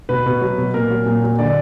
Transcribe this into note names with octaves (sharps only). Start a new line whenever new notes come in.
B2 B4
B2
F#3
B2
A#2 A#4
F#3
A#2
F#3
D3 D5